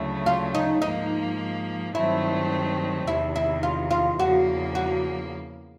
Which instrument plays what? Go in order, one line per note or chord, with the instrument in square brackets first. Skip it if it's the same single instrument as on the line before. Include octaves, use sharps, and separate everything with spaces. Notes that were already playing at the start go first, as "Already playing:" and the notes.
Already playing: [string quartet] D2 C#3 F#3 A3 [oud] E4
[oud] F4
D#4
[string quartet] G#2 F3 A#3 [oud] D#4
[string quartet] G2 D#3 F#3 A3 C4 [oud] E4
[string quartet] E2 C3 D#3 [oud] E4
[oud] E4
F4
F4
[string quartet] E2 C#3 F3 A#3 [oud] F#4
[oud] F#4